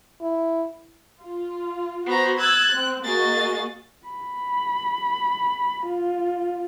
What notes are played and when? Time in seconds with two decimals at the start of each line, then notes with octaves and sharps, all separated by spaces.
0.21 E4
1.21 F4
2.06 B3 F#4 C5 A#5
2.39 E6 F#6 G#6 A6
2.73 C4
3.04 A#3 F#4 G#4 D#5 A6
4.07 B5
5.87 F4